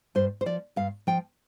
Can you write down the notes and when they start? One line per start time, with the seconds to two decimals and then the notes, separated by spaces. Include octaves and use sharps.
0.15 G2 C5
0.41 C5
0.46 F3 D5
0.76 G2 F5
1.07 F3 G5